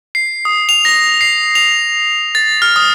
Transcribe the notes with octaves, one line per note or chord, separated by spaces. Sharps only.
C7
D#6
F7
A#6
C7
F7
A6
F6
D#6